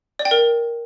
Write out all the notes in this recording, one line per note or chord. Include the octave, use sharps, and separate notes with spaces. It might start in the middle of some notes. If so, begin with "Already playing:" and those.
D5
G5
A#4